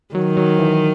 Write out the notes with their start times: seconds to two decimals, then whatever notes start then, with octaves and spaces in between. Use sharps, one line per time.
0.15 D#3 F#3
0.37 F#3
0.59 E3